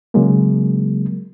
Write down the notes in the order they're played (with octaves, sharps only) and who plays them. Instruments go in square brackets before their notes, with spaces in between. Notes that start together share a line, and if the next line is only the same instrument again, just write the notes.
[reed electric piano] C#3 F#3 G#3 A#3